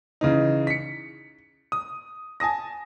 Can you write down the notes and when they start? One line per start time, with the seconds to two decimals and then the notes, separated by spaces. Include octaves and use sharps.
0.21 C#3 E3 D#4
0.67 B6 C#7
1.72 D#6
2.40 G#5 A5 D#6 A#6